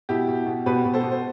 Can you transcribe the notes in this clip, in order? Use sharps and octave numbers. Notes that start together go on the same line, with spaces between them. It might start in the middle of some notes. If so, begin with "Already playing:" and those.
B2 E4 G4
B2
B2
B2 G4 B4
B2
A4 C5
B2
C5